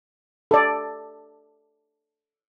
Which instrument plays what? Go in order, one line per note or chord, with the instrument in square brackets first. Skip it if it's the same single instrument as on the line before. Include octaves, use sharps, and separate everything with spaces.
[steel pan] A4 D5